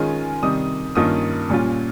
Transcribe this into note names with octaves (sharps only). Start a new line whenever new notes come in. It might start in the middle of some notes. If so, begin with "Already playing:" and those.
Already playing: D#3 G#3 C#4 F4 G#5
C3 D#3 G3 D#6
G2 D#3 A#3 C#4 F4 D#6
A#2 G3 C#4 F4